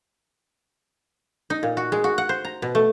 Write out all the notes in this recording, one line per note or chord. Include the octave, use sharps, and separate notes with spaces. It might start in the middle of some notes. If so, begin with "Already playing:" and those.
D#4
A#2
F#4
G#3
F#4
F#5
C5
A#5
B2
A3